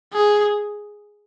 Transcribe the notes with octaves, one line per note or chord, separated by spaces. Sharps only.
G#4